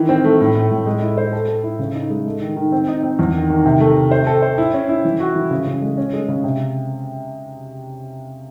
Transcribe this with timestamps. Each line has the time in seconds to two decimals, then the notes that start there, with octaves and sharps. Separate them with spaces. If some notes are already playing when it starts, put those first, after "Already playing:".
Already playing: D#3 E3
0.09 C4
0.24 A3
0.40 A2
0.55 A2
0.71 A2
0.86 G#3
1.02 E4
1.18 C5
1.33 A4
1.48 A4
1.63 E4
1.79 C#3
1.95 D#4
2.10 G#3
2.25 A3
2.42 D#3
2.56 D#3
2.72 C4
2.88 D#4
3.03 C4
3.19 E2
3.34 D#3
3.50 D#3
3.66 C3
3.80 A3
3.96 C3
4.11 C5
4.27 A4
4.42 C5
4.58 E4
4.74 C#4
4.89 E4
5.05 E3
5.20 F#4
5.35 E3
5.51 C#3
5.67 C#3
5.82 G#3
5.97 C#4
6.13 G#3
6.28 C#3
6.44 C3